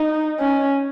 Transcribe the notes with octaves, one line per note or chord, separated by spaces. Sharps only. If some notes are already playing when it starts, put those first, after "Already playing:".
Already playing: D#4
C#4